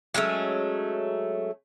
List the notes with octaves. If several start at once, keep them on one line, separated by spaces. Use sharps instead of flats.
F#3 G#3 A3 C#4